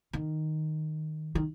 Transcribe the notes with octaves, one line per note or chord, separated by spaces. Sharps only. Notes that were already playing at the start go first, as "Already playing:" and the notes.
D#3
D#3